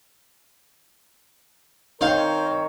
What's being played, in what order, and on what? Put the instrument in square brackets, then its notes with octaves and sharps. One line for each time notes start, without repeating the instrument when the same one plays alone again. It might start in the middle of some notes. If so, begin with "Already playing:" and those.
[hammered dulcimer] D#3 [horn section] C4 A#4 C#5 [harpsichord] C5 F5